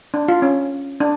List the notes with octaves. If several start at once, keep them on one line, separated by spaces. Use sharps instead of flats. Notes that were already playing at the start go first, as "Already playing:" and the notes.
D4
F4
C#4
D4